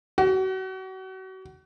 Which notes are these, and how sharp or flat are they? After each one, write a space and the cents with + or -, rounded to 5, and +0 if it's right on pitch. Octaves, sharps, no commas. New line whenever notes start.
F#4 +35